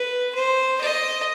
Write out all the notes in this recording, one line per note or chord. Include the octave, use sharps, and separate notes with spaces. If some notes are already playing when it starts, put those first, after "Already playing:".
Already playing: B4
C5
D#5